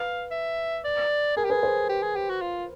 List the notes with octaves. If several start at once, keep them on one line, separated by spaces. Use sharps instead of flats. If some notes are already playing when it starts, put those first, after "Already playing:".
Already playing: B4 F5
E5
D5
G#4 A#4
G4
G#4 B4
C5
G4
G#4
G4
F#4
F4